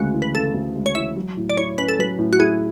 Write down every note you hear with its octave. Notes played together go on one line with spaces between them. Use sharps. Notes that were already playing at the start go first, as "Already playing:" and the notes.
Already playing: D2 C#3 G#3 F#4
E3
B4
C#3 A4
D2
G#3
C#5
E3 E5
F#3
A2
D5
E4 C#5
C#4 B4
A4
F#3 B4
A2
F#4
E4 G#4